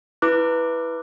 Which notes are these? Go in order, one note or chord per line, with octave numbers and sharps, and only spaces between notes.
E4 B4 D6 F#6